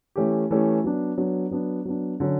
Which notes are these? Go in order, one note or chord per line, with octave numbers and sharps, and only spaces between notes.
E3 A3 C#4 G4
E3 A3 C#4 G4
F#3 B3 D4
F#3 B3 D4
F#3 B3 D4
F#3 B3 D4
D3 F#3 C#4